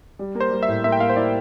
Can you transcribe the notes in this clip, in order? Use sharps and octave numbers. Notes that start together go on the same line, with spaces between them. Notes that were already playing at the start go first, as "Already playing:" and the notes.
G3
A#3
C5
G3
E5
A2
A#3 E5
G5
A#3 F5
C5
E4 D5